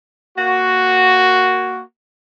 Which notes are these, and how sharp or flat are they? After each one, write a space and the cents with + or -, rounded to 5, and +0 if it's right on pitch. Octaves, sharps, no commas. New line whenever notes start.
A#3 +0 F#4 +0